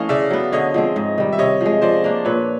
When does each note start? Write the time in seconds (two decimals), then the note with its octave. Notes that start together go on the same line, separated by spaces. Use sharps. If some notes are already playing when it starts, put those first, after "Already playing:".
Already playing: E3 A3 C#4 D#5 F5
0.09 C#3 D5 E5
0.30 F#3 B3
0.52 D3 C#5 D#5
0.74 F3 G#3 C4
0.96 G#2
1.18 D#3 G3
1.32 E5
1.38 C3 C#5 D#5
1.61 F3 G#3
1.81 F3 C5 D5
2.04 A#3 D4
2.25 A#2 B4 C#5